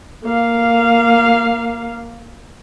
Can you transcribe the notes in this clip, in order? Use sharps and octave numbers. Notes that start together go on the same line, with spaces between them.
A#3 F5